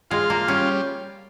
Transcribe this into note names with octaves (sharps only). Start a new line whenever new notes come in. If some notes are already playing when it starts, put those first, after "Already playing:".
G#3 F4
A#3
G3 C#4